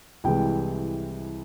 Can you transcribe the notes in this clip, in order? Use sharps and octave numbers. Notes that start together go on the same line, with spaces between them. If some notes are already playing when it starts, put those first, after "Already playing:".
C2 C3 E3 G#3 G5